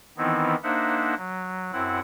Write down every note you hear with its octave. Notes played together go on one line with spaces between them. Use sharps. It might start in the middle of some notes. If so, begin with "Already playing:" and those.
D#3 E3 B3 C4 D#4 E4
A#3 D4 D#4 C5 E5 F#5
F#3
F#2 C4 E4 F#5